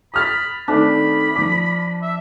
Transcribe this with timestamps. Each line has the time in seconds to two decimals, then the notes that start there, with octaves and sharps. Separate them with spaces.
0.14 B5 D#6 F6 A6
0.68 D#3 A3 C4 D4 B5
1.36 F3 D6
2.02 E5